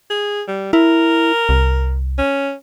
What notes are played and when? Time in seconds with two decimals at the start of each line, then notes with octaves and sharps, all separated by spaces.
0.10 G#4
0.48 G3
0.73 E4 A#4
1.49 C2
2.18 C#4